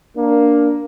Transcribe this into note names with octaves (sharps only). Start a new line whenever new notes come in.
A#3 D4